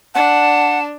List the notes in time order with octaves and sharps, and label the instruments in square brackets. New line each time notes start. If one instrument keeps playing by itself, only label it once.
[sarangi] D4 [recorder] F#5 [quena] A5